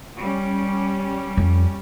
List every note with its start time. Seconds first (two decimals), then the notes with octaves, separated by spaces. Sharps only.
0.17 G3 C#4
1.37 F2